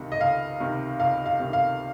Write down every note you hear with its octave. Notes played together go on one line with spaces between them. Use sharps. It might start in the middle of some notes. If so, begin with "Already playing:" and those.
Already playing: C#2 C3 D#3
D#5
C#2 F5
C3 D#3
C#2 F5
F5
C3 D#3
F5